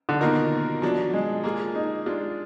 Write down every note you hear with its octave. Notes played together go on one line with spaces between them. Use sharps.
D3
B2 D#3 A#3 F4 A#4
B2 F3 F#3 D4
G#3
A#3 F4 G#4
D#4
G#3 D4 F4